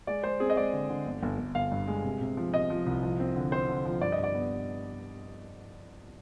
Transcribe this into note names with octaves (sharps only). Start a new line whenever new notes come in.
G#3 D5
G#3 C5
C4 G#4
D#5
G#3 D5
D3
D3
G1
G1
G1
G1 F5
G2
G#3
C3
C3
F3
C3 D#5
F3
C2
F3
C4
D3
C4 C5
D3
F3
G2 D5
D#5
G2
D5
B3